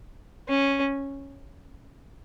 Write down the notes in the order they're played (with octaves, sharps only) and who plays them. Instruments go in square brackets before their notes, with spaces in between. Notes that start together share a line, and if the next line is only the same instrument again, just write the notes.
[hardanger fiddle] C#4